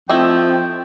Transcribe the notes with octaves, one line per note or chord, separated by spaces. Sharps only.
F3 A3 C4 E4 D#5 G5